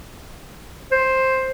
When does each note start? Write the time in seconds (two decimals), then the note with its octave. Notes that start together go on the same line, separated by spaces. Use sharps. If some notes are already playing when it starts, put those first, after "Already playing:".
0.91 C5